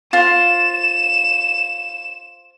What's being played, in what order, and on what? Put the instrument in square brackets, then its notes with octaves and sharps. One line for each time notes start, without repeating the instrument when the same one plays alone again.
[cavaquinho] F4 C5 [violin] E7